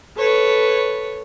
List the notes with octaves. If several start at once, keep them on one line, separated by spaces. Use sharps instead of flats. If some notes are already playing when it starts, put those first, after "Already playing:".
A4 B4 C#5